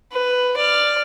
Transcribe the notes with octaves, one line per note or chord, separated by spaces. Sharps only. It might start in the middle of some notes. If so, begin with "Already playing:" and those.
B4
D5 F6